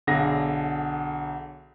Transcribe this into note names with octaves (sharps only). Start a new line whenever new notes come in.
B1 D3 G#4 A#6